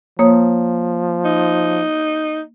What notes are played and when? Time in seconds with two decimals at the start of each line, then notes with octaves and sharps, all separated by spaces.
0.19 F3 A#3 C#5 D#6
1.25 D#4